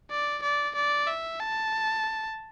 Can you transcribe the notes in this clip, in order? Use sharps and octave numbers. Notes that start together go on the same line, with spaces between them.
D5
D5
D5
E5
A5